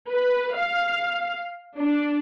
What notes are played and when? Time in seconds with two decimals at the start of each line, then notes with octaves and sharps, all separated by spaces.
0.10 B4
0.55 F5
1.79 D4